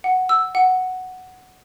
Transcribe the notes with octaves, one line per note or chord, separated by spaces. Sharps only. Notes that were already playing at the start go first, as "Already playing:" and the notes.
F#5
E6
F#5